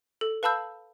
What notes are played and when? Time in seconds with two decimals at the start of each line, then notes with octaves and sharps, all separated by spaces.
0.21 A4
0.43 B4 F5 A5 B5 E6 G6